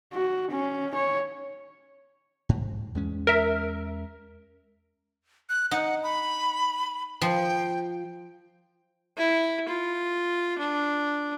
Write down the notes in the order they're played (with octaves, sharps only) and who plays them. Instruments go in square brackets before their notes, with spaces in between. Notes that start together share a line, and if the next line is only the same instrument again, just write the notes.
[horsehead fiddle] F#4
C#4
C#5
[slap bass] G#2
E2 G#3 C#4
[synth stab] A#4 E5
[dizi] F#6
[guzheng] D#4 [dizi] F#5
[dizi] B5
[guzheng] F3 [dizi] G5
[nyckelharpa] E4
F4
D4